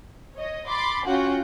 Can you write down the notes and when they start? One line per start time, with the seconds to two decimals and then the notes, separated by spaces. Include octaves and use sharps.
0.34 C#5 D#5
0.66 B5 C6 D6 A6
1.06 C#4 F4 F#4 F#5 G5